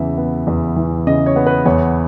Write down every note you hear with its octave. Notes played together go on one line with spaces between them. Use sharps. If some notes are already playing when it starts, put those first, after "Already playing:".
Already playing: E2 C#3 E3 E5
B3
E2
E3
C#3 D#5
C#5
B3
B4
E2 C#5